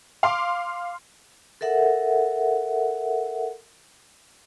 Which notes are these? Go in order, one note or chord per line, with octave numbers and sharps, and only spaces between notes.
F5 C6 D6
A4 A#4 E5 F#5